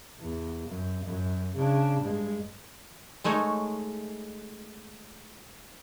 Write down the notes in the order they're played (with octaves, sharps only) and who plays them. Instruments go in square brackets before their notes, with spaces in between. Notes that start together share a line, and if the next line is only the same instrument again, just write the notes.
[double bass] E2
F#2
F#2
C#3 D4
G2 G#3
[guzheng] G#3 A3 D#4 C#5